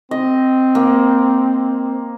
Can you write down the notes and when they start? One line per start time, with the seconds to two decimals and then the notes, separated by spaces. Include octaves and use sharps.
0.11 C4 D#5
0.75 A#3